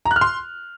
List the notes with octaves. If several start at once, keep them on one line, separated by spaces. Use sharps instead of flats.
A#5
F#6
F6
C6